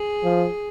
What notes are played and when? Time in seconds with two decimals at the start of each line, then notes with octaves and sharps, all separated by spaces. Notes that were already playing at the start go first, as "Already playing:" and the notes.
Already playing: G#4
0.23 F3